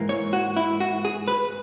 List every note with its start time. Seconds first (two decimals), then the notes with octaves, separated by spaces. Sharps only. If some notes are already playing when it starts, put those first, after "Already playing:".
Already playing: G#2 E3 A#3
0.09 C#5
0.33 F#4
0.57 E4
0.80 F#4
1.05 G#4
1.28 B4